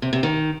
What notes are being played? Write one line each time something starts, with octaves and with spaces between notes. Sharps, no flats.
C3
C3
D#3